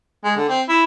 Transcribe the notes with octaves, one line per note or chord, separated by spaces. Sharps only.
G#3
D3
C4
E4